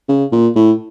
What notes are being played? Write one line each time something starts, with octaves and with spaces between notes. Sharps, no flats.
C#3
A#2
A2